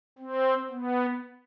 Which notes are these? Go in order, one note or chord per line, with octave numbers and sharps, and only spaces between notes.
C4
B3